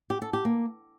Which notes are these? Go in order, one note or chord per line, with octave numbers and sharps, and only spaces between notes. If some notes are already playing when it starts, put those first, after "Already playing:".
G4
A4
G4
A#3